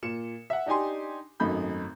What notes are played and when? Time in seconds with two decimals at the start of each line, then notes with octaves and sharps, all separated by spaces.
0.03 A#2 C#7 E7
0.50 E5 F#5
0.66 D4 D#4 G4 G#5 C6
1.40 G#1 F#2 A3 D#4 B5 G6